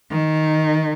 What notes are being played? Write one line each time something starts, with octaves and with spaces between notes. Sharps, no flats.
D#3